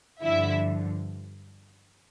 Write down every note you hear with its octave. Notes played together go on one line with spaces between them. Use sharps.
G2 D3 F3 E4 E5